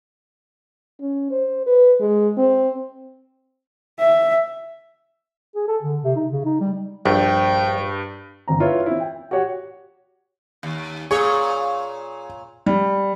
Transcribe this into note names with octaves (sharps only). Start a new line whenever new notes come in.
C#4
C5
B4
G#3
C4
E5
G#4
A4
D3
C3
D#4
C#3
D#4
G3
A#1 G2 G5
G1 C4 A#5
E4 F4 B4 C#5
C4 E4
G5
F#4 G4 C#5 F#5
D#2
A#2 G#4 C#5
G3